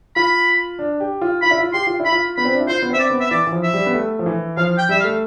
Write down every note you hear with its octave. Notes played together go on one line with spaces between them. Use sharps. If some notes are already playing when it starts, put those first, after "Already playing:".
F4 B5
D4
G4
F4
F4 B5
E4
F4
G4 C6
F4
E4
B5
F4
B3 B5
C4
D4
E4
F4 C5
B3
C4 E5
D5
B3
E5
E3 D5
E3
F3
E5
G3
B3
A3
F3
E3
F3 F5
G5
G3 E5
F5
A3